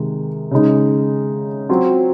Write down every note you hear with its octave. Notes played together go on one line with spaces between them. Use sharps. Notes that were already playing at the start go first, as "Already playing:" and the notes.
Already playing: C3 D#3 G#3
C#3 G#3 D#4
F#3 C4 F4